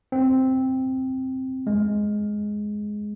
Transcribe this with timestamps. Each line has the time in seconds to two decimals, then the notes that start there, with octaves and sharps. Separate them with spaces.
0.12 C4
1.67 G#3